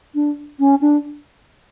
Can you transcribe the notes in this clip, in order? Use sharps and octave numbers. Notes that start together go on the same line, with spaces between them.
D4
C#4
D4